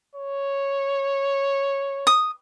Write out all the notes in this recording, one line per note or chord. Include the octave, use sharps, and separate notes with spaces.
C#5
D#6